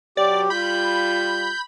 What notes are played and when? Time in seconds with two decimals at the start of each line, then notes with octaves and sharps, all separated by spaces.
0.17 B2 F#3 G4 D5
0.50 G3 F4 B5 G6